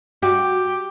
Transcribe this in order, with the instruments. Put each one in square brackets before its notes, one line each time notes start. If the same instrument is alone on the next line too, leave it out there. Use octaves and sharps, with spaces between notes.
[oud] F#4 [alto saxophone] G4